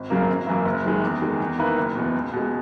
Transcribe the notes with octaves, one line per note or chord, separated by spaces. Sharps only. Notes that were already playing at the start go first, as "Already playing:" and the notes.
Already playing: G#1
F#2 C#3 F#3 A#3
G#1
F#2 E3 A#3 E4
F#1
F#2 D#3 G#3
E2
D#3 G#3
E2
D#3 A#3 E4 B4
F#1
E2 B2
C#2
B2 G#3